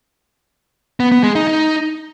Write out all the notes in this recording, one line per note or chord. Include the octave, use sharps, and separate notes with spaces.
B3
B3
G#3
D#4
D#4